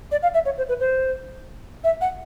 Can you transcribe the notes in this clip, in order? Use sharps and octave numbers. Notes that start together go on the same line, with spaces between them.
D5
F5
E5
C#5
C5
B4
C5
E5
F#5